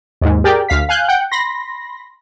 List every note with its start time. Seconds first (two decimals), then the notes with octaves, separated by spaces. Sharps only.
0.21 D#2 G#2
0.44 G4 G#4 A#4 D5 G5
0.69 D2 F5 B6
0.89 F5 G#5 F#6 G6
1.08 F#5 G5 G6
1.32 B5 C6 A#6